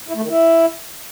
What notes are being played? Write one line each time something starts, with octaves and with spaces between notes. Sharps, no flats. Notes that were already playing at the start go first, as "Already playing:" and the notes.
E4
A3
D#3
E4